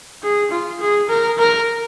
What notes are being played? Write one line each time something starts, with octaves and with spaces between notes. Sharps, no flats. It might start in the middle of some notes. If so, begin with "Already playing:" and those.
G#4
F4
G#4
A#4
A#4